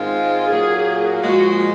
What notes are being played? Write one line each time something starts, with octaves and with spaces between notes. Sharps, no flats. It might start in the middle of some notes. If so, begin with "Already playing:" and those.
Already playing: G#2 D#3 G#3 C4 F4
A#2 F#3 A#3 G#4
A#2 F3 G#3 F#4